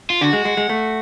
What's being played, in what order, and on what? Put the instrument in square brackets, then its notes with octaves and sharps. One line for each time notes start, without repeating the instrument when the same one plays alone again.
[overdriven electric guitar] F4
[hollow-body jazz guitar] D3 [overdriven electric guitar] F#4
[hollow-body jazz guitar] G#3
G#3
G#3
A3